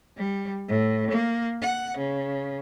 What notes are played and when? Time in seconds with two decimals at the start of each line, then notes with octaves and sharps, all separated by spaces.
0.17 G3
0.68 A2
1.11 A#3
1.62 F#5
1.98 C#3